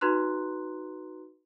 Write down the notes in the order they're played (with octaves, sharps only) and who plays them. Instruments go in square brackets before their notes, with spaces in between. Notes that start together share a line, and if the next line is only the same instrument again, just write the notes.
[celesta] D#4 F#4 B4 A#5 C6 F#6